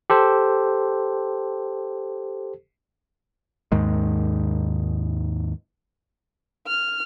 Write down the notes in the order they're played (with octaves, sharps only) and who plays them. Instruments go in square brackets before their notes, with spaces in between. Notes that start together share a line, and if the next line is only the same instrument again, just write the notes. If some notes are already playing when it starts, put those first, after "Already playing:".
[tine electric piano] G4 A4 C5
[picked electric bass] D#2 G#2 D#3 G#3
[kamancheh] F6